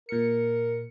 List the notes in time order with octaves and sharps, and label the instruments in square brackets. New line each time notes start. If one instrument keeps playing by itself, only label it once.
[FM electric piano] A#2 C#7 [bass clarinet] A#4